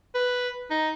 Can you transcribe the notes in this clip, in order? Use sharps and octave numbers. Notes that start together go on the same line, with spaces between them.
B4
D#4